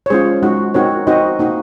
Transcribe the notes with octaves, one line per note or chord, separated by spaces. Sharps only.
C#5
G#3 C#4 F4 G#4 C5
G#3 D#4 F#4
C4 D#4 F#4 A#4 C#5
C4 D#4 F#4 C5 D#5
A#3 D#4 F#4